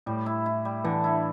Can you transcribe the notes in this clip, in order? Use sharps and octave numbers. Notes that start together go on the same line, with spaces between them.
A2 G3
E4
E4
G3
D3 E3
E4